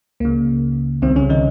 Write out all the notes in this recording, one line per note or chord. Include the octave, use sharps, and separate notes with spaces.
C#2 C#3 A#3
C2 C3 D#3 C4
C#3 C#4
D#3 D#4